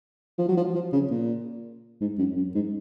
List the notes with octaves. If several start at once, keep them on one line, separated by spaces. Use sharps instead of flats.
F3
F#3
F3
F3
C#3
A#2
G#2
F#2
F#2
G#2